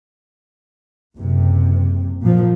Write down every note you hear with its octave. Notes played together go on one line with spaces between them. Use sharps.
F#1 C3
A#2 F3